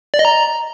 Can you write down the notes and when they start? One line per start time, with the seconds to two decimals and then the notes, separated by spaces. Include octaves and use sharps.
0.14 D5
0.19 D#5
0.25 A#5